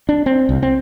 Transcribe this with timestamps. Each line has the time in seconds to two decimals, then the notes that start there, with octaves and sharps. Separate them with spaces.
0.09 D4
0.26 C4
0.49 C2
0.63 C4